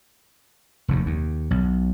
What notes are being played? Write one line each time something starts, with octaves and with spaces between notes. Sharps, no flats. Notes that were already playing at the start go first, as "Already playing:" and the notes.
F1 D#2
D#2
B1